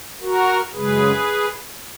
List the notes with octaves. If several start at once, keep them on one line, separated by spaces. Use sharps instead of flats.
F#4 A#4
F#2 C#3 G#3 G#4 B4